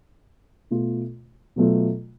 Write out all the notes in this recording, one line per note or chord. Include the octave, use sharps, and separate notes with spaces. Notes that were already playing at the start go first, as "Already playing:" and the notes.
B2 A3 F4
B2 F#3 A3 F4